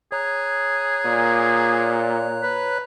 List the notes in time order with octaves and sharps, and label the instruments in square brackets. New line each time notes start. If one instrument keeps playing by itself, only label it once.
[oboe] G#4 [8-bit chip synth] C#5 A#5 F#6
[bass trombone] A#2
[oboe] B4